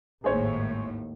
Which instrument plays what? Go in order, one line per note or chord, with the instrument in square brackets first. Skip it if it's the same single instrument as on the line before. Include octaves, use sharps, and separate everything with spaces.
[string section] G#1 D#2 A2 [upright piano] G#4 C5 C#5